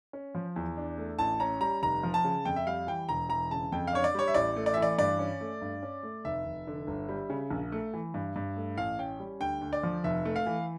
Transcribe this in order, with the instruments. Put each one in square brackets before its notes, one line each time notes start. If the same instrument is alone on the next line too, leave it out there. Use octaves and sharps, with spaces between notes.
[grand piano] C#4
F3
E2
D4
A3
A1 A5
C#4 A#5
G3 A#5
F1 A#5
F3
A5
C#3
F2 G5
E5
G3 F5
E3 G5
E1 A#5
E3 A#5
C#3 A5
F2 G5
F5
D4 C#5
D5
G3 C#5
E5
A1 D5
A3
D5
E5
E3
D5
G2 D5
C#4
A3
G2
C#4
A3
F1 E5
F1
D3
G1
G3
C#3
A#1
A3
E3
G2
G2
A3
A1 F5
C#4 G5
G3
D2 G5
D2
D5
F3
F1 E5
A3
F5
E3